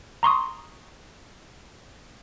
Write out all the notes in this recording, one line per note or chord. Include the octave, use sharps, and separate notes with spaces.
A#5 C6 C#6 D#6